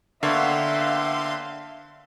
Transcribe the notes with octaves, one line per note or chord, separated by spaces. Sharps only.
D3 A#3 B3 C#5 E5 F5 G5 C6